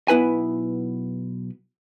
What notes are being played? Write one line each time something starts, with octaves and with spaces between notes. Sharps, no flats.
B1 B3 E4 B4 G#5